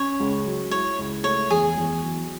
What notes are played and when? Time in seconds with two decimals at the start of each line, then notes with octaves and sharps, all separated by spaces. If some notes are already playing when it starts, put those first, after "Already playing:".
Already playing: C#4 C#5
0.20 C#2
0.45 F#3
0.71 E4 C#5
0.98 C#2
1.24 A3 C#5
1.50 E2 G#4
1.77 E2
2.03 F#3